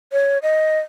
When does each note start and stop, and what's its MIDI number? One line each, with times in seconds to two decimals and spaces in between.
0.12 0.38 73
0.43 0.79 75